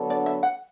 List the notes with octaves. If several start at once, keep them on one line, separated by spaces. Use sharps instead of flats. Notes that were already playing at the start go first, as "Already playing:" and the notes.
Already playing: D3 F#3 B3 D4 A4
D5
E5
F#5